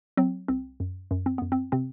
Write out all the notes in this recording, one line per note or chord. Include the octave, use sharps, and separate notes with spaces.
F#3 C4
C2 C4
F#2
F#2
C4
F#2 B3
C4
C3 C4